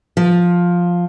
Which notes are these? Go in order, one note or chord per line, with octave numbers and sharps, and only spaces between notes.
F3